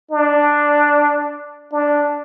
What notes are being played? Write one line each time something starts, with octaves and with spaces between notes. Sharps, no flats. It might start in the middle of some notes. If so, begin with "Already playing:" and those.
D4
D4